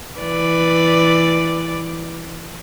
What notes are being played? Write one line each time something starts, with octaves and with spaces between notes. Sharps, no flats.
E3 B4 D5